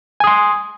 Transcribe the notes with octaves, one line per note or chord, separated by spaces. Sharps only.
G#5 C6 D#6